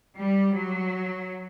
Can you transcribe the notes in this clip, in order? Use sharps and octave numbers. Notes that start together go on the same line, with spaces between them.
G3
F#3